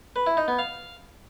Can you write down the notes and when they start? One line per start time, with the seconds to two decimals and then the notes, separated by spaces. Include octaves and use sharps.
0.16 B4
0.27 E4
0.37 D#4
0.48 B3
0.59 F5